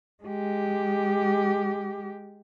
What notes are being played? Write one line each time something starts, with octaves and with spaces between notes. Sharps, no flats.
G#3 G4